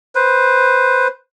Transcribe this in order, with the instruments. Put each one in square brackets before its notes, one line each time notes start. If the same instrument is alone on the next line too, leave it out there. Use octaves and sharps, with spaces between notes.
[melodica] B4 C5